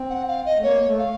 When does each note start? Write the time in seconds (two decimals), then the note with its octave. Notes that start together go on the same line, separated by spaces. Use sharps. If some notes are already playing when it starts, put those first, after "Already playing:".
Already playing: C4
0.10 F#5
0.28 F5
0.46 D#5
0.58 A3
0.63 A#3 C#5
0.87 A3
0.98 F5